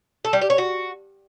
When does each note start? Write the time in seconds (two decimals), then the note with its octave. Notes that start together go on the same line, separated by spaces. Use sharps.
0.25 A4
0.33 G3
0.41 G4
0.50 C#5
0.58 F#4